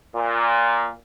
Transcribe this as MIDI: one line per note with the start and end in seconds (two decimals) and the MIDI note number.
0.16 0.92 46